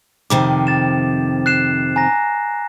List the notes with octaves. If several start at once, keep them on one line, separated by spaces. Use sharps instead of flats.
F2 C3 D#3 D6
A6 E7
F#6 C7 E7
G#5 A#5 A#6